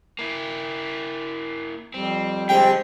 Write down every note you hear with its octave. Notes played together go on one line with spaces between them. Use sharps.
A#3 E4
F2 G3 C4
D3 G#3 C4 G4 G5